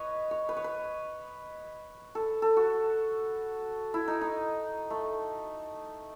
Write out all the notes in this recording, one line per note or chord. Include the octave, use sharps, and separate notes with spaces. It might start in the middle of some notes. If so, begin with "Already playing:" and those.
Already playing: B4 C#5 D#5
C#5
B4
C#5
B4
A4
A4
F#4
E4
D#4
D#4
A3